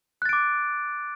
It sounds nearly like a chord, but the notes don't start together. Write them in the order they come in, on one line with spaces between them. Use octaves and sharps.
F#6 A6 D7 D6